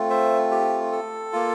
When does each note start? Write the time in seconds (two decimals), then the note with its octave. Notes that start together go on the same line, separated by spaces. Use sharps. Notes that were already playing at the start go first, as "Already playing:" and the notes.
Already playing: A3 C4 F4
0.10 C5 E5
0.51 G4
0.92 A4
1.33 A#3 F4